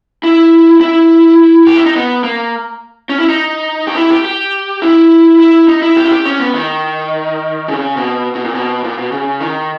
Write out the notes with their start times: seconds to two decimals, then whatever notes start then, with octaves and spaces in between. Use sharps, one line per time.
0.23 E4
0.81 E4
1.67 G4
1.76 E4
1.86 D#4
1.96 B3
2.24 A#3
3.09 C#4
3.20 E4
3.29 D#4
3.87 G4
3.96 E4
4.10 G4
4.25 G4
4.82 E4
5.40 E4
5.68 D#4
5.82 E4
5.97 G4
6.05 E4
6.11 G4
6.25 C#4
6.40 B3
6.54 D#3
7.68 C#3
7.97 B2
8.35 B2
8.45 A#2
8.55 B2
8.84 A#2
8.98 B2
9.12 C#3
9.41 D#3